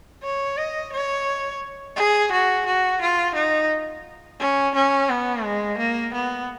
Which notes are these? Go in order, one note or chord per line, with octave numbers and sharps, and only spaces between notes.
C#5
D#5
C#5
G#4
F#4
F#4
F4
D#4
C#4
C#4
B3
G#3
A#3
B3